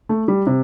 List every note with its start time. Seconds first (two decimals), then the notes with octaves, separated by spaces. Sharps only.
0.09 A3
0.28 G3
0.47 C3